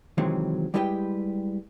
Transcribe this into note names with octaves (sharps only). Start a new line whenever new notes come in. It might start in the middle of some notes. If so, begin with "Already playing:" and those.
C3 D#3 E3 F#3 G#3 C4
G3 G#3 E4 G4 B4 G5